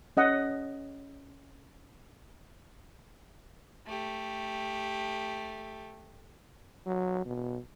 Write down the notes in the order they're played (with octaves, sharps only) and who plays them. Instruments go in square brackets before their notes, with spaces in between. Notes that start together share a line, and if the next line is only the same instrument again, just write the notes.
[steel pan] C#4 D#5 F#5
[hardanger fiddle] A3 G4
[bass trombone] F#3
B2